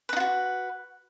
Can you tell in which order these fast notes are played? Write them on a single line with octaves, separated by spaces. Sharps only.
B4 D#4 F4 F#4